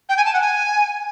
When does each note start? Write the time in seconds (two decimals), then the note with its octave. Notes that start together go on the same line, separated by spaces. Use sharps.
0.09 G5
0.17 G#5
0.25 A5
0.33 F#5
0.41 G#5